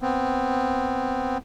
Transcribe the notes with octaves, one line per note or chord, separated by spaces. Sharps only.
B3 C4